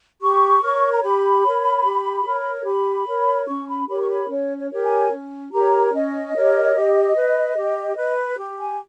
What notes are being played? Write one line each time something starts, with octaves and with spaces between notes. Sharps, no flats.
G4 C#6
A#4 C#5
A#5
G4 B5
A#4 C#5
G4
A#4 C#5
G4 B5
A#4 C#5
C#4 C#6
B5
G4 A#4 C#5 B5
C#6
B5
C#4 C#5
C#5
G4 A#4 C#5
G#5
C#4
G4 A#4 C#5 A#5
C#4 D#5
G4 A#4 C#5
G4
B4
G4
B4
G4
G#5